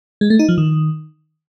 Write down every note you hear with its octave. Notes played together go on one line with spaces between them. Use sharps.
G#3
A3
D#4
F3
D#3